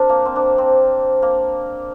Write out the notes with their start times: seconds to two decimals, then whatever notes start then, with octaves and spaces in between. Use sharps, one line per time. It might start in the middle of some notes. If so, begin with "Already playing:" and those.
Already playing: C4 D4 A#4 C5
0.09 A#3
0.25 C4
0.36 D4
0.58 C4
1.22 A#3